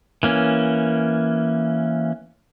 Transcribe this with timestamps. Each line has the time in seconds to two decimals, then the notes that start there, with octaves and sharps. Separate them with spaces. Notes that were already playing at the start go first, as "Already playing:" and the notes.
0.23 E3 A#3 C#4